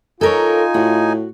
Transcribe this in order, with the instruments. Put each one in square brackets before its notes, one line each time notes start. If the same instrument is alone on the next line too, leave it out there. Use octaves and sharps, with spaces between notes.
[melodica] D#4 G#5 [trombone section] F4 [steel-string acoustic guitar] A4 A#4 C#5
[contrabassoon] A2 [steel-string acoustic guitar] F#4